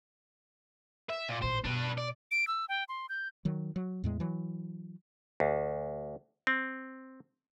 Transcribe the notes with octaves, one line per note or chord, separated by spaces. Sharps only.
E5
A#2
A1 A#2 C5
B2 D4 B4
D5
D7
E6
G5
C6
G6
D#3 F#3
F#3
E2 A2 G#3
E3 F#3
D2
C4